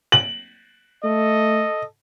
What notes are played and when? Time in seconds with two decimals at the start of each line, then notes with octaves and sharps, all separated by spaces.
0.12 F#7
1.04 A3 A4 D#5